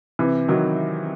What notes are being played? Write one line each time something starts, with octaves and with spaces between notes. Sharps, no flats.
C3 E3
D#3 F#3